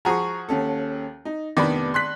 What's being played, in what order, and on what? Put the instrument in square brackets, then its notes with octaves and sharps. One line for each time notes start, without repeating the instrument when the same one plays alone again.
[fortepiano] F3 F#4 G#4 [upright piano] A#5 C#6
[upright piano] D#2 C#4 A4
D#4
[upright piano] F1 B3 D6 [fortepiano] D#3 D4 B5
[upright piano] C6 F#6 B6